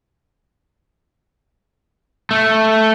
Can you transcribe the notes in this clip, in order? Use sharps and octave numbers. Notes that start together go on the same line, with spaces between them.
A3